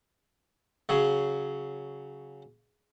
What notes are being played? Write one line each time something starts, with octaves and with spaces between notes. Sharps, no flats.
C#3 F#3 G#4